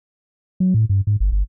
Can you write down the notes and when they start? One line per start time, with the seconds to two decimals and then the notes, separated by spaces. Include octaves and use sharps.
0.60 F#3
0.74 A2
0.89 G2
1.07 G#2
1.20 G1
1.32 G1